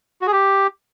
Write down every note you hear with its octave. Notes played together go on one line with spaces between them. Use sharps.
F#4
G#4
G4